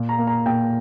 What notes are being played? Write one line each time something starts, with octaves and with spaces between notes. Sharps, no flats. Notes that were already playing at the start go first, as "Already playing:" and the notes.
Already playing: A#2
A#5
A#3
A#5
A#2 G5